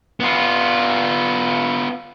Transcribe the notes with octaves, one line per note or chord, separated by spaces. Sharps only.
B3 F4